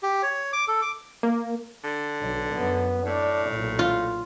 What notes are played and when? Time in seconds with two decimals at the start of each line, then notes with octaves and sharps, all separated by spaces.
0.03 G4
0.23 C#5
0.53 D6
0.68 A4
0.82 D6
1.23 A#3
1.84 D3
2.20 B1
2.52 F#2 B3
3.06 A2 D4
3.49 B1 A#2
3.79 F4